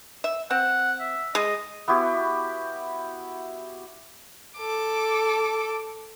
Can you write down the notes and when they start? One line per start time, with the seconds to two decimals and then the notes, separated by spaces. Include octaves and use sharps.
0.24 E5
0.51 C4 F#5
1.00 E5
1.35 G#3 D#5
1.88 B3 E4 F#4 G4
4.57 A4 D6